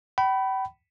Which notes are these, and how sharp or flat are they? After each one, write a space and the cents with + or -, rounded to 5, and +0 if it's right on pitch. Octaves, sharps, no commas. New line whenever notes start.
G5 -40 B5 +0